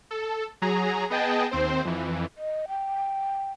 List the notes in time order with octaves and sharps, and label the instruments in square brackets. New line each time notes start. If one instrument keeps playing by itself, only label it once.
[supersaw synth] A4
F#3 G#4 A#5
B3 G#4 D#5 G5 A5
D#2 C4 C5
F2 E3
[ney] D#5
G5